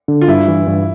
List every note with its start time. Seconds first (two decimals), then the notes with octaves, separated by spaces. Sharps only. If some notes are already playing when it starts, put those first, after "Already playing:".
0.08 D3
0.21 F4
0.28 G2 E4
0.48 E3
0.67 G2